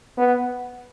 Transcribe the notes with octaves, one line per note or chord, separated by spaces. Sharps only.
B3